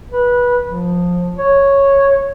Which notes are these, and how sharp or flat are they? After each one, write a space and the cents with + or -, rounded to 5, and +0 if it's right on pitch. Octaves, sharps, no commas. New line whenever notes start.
B4 -20
F3 +20
C#5 -5